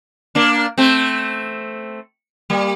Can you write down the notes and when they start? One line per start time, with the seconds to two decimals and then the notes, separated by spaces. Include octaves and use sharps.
0.35 A#3 D4
0.78 A3 C4
2.50 G3 A#3